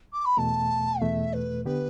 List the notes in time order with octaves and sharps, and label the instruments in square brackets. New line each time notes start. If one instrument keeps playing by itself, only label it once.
[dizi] D6
B5
[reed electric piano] E2 B2 A3 [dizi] A5
[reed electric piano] E2 B2 A3 [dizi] E5
[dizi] B4
[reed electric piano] D3 B3 G4 [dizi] B4